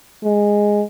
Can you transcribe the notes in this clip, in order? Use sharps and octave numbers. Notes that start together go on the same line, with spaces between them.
G#3